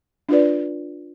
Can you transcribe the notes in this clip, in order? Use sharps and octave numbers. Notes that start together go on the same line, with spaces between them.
D4 F4 B4 D5